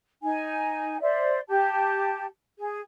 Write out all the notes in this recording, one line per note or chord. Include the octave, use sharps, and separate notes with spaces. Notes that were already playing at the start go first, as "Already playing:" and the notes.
D#4 G#5
C5 D5 E5
G4 A5
G#4